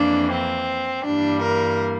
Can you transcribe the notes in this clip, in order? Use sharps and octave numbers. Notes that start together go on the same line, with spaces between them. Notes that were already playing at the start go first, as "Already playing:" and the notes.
Already playing: F2 E3 A#3 D4
C4
G2 E3 G3 A#3 D4
A#4